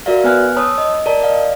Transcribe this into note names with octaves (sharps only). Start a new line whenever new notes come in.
F#4 A#4 D5 E5 F5
B3 B4 G#5 F6 F#6
C#5 A5 B5 D#6 E6
D#5
A#4 D5 A5
D5 D#5 F5